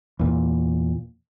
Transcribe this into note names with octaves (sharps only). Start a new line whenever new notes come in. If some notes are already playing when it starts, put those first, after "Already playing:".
E2 A#2